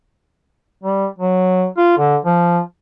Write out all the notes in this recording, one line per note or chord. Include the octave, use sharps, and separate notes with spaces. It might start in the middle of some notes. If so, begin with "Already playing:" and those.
G3
F#3
F4
D3
F3